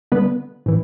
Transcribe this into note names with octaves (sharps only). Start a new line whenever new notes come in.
D3 G3 B3 B4
A2 E3